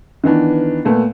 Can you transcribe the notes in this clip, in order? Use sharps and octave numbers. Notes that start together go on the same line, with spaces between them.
D#3 E3 B3 D4
A#2 A3 B3